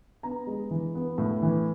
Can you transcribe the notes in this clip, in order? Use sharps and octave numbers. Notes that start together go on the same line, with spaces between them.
B3 A#5
G#3
E3
B3
A2
E3